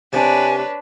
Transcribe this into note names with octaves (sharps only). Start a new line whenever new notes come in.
C3 D4 B4 C#5 G#5